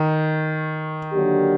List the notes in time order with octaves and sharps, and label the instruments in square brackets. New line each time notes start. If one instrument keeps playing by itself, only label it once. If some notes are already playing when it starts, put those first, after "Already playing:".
Already playing: [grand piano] D#3
[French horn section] D3 F#3 A#3 D4 G4